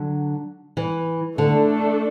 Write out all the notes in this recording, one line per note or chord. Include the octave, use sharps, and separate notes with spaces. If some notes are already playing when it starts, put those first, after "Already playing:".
Already playing: D3 F#3
E3
D3 A3 D4 A4